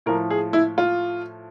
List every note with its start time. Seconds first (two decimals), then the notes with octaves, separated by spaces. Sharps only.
0.06 A2 F3 A#4
0.30 G#4
0.53 E4
0.78 F4